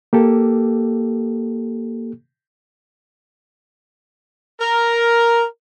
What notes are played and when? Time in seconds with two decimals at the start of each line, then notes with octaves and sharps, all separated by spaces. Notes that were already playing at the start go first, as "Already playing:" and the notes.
0.13 A#3 G4 A4
4.61 A#4